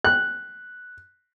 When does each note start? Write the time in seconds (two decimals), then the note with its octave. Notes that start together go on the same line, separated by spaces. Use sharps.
0.05 F#6